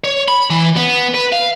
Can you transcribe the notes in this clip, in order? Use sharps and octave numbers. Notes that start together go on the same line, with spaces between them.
C#5
B5
E3
B3
B4
F5